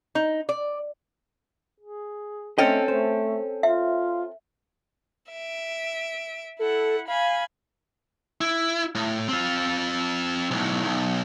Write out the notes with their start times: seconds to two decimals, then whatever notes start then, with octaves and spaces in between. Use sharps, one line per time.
0.15 D#4
0.49 D5
1.80 G#4
2.58 A3 C4 C#4 A4 D#5 G5
2.88 A3 C5
3.63 F4 E5
5.31 E5 D7
6.59 E4 A4 F#5
7.08 F5 G#5 B5
8.41 E4
8.95 A2
9.29 C4 F4
10.51 B1 A2
10.85 B1